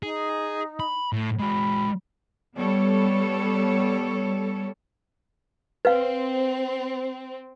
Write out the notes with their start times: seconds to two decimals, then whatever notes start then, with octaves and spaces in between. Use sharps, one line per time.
0.03 D#4 G#4
0.80 B5
1.13 A2
1.39 G#3 F#4 B5
2.56 G3 B3 A4 C#5
5.85 C4 B4 F5